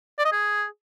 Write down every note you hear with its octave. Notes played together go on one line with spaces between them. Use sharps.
D5
D#5
G#4